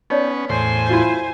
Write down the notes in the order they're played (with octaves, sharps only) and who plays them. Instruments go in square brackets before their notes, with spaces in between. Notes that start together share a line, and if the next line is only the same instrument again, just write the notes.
[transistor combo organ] B3 C#4 [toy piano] D#4 C#5 D5
[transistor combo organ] E2 A2 C6 [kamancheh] C5 G#5
[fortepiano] E4 F4